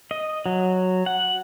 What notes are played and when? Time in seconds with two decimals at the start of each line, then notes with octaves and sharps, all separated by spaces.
0.11 D#5
0.46 F#3
1.06 F#5